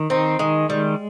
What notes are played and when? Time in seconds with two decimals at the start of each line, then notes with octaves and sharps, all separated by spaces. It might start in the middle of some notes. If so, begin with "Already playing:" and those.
Already playing: D#3
0.10 C4 D#4
0.39 D#3 G#3
0.69 G3 G#3